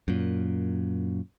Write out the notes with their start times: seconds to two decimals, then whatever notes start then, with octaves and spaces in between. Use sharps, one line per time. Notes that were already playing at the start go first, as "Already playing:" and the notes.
0.08 F#2 A#2